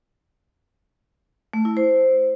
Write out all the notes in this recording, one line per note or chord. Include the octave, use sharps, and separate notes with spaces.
A3
E4
C5